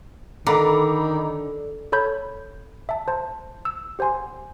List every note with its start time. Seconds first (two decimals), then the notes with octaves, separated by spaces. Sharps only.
0.47 D3 D#3 A#5 B5 D6
1.92 A4 C#5 B5 G6
2.89 E5 A5
3.08 C5 A5
3.65 E6
3.99 G4 C5 F#5 G#5 C6